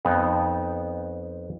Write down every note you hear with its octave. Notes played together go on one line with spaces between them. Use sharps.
F2 B3 D#4